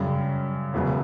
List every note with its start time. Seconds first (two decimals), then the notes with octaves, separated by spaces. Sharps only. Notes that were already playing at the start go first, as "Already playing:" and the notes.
Already playing: F#2 C#3 G3
0.73 E1 E2 C#3 F#3 B3